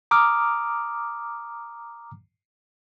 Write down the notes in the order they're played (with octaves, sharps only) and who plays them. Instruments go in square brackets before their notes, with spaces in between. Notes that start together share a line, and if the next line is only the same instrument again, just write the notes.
[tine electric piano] A#5 D6 D#6 F6